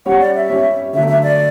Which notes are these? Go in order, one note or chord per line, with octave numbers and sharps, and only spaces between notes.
G3 C#4 G4 C#5 F#5
D5
E5
G3 C#4 G4 C#5
D3 F#3 A3 E5
E5
D5